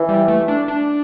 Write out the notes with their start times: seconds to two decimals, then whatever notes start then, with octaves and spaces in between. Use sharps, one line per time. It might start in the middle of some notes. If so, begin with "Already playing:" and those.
Already playing: E3
0.09 G3
0.28 A3
0.48 D4
0.68 D4